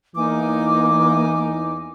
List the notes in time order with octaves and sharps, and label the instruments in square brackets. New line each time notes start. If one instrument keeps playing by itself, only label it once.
[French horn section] E2 E3 [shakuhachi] A#3 [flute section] D#4 G#5 D6